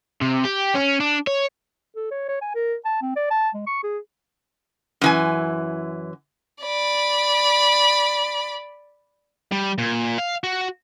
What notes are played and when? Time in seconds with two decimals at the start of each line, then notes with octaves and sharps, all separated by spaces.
0.22 C3
0.45 G4
0.75 C#4
1.00 D4
1.27 C#5
1.96 A4
2.11 C#5
2.29 C#5
2.41 G#5
2.55 A#4
2.85 A5
3.02 C4
3.16 D5
3.31 A5
3.54 G#3
3.67 C#6
3.83 G#4
5.01 F#2 E3 G#5
6.63 D5 B5
9.52 G3
9.78 A#2
10.18 F5
10.44 F#4